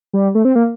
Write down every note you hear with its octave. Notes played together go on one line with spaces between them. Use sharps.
G3
A3
C4
A#3